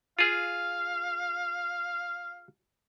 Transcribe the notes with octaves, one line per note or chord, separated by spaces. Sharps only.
F4 G#4 F5